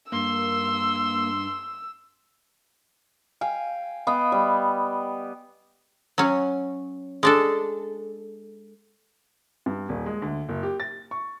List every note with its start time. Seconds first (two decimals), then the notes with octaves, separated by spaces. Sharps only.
0.12 G2 A#3 C6 E6
3.41 F5 G5 G#5
4.07 B3 D#5 F5 G5
4.32 G3
6.18 F#3 C#4
7.23 G#3 D4 A4
9.66 G2
9.89 D#1
10.06 G#3
10.22 D2
10.49 F#1
10.63 G4
10.80 A6
11.11 C#6